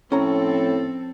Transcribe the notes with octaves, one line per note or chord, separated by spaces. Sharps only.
A2 F3 C4 C#4 A4 A#5